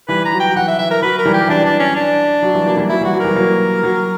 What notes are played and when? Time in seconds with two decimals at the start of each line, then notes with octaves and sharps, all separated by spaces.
0.08 E3 G3 B4
0.25 A#5
0.32 F#3
0.40 G5
0.46 F#3
0.56 E3 F#5
0.68 E5
0.78 E3 E5
0.91 A#4
1.02 F#3 B4
1.18 A#4
1.25 E3 G3
1.33 G4
1.48 E3 D4
1.65 D4
1.80 C#4
1.96 D4
2.43 F#3
2.55 E3 G3
2.66 F#3 A#3
2.77 E3 G3
2.89 F#3 E4
3.01 E3 G3 F#4
3.13 F#3
3.20 E3 G3 A#4
3.36 F#3 A#3
3.83 F#3